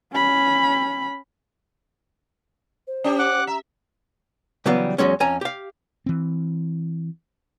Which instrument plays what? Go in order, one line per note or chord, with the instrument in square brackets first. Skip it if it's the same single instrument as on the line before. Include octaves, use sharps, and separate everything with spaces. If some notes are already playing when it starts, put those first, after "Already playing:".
[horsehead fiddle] C#4 B5
[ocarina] C5
[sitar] C#4 G4
[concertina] F#5 D6 F#6
[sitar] E5 [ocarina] A#5
[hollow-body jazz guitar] C#3 E3 F#3 G3 B3
E2 F#3 G#3 C#4
F2 C#4 G#5 A#5
G4 F5
[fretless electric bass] E3 C4